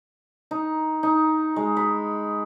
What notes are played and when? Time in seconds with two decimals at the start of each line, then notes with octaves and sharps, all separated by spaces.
0.51 D#4
1.03 D#4
1.56 G#3
1.77 B5